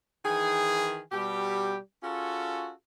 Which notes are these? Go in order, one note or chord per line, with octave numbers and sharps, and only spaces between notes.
D#3 E3 G#4
B2 G3 G4
C#4 F4 F#4 G#4 A4